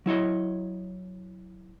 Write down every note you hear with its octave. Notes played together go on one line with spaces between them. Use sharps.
F#3 E4 C#5 D#5